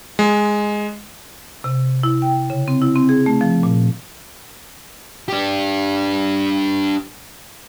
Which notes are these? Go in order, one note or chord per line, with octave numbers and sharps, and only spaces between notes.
G#3
C3
E4
G5
C#3
C4
E4
C4
G#4
A3
F3
A#2
D4 G4